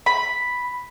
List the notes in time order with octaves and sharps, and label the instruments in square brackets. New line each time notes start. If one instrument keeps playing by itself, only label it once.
[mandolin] B5